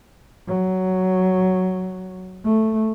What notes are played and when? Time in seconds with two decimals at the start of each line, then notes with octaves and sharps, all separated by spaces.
0.48 F#3
2.45 A3